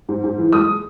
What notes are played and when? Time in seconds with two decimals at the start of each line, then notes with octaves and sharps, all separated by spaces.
0.09 G#2
0.24 G#2
0.38 E3
0.53 G#3 D#6